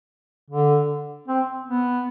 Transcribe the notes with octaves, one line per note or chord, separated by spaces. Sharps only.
D3
C4
B3